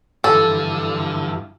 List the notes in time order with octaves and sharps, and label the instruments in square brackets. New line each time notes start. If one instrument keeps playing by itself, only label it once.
[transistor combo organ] G2 E3 F3 [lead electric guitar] D3 [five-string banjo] A4